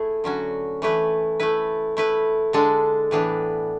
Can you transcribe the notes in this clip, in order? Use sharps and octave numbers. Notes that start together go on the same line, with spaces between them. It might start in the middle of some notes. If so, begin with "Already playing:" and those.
Already playing: A3 E4 G#4
D3 F#3 C#4 F#4
E3 A3 E4 B4
A3 E4 B4
A3 E4 B4
D3 G#3 D4 A4
A2 E3 B3 D4